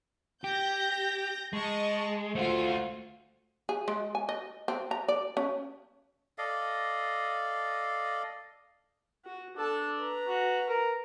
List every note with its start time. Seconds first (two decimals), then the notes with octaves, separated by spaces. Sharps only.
0.44 G4 G6 A#6
1.53 G#3 D#5 A5 C#6
2.35 A3 F4 F#4 C5
3.69 G#4
3.88 G#3
4.15 G#5
4.29 D#5
4.68 C4
4.91 A#5
5.08 D5
5.37 C#4
6.38 A4 D5 D#5 F5
9.25 F#4
9.57 D4 A4 A5
9.97 B4 A#5
10.28 F#4
10.69 A#4